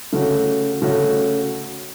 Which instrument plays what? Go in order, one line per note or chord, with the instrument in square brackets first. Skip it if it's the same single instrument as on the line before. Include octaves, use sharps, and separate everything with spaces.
[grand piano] C#3 A3 C#4 F#4
C#3 A3 C#4 F#4